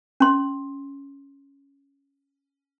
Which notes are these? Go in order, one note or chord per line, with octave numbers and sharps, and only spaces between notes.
C#4 C6